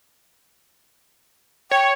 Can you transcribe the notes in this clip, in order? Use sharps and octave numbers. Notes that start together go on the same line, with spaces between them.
C#5 G5